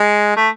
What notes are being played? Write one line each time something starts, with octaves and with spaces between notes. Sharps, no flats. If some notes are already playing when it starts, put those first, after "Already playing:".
Already playing: G#3
A3